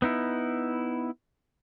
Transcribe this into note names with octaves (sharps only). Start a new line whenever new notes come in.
B3 D#4 E4